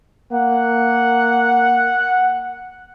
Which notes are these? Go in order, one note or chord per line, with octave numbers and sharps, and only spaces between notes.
A#3 F#5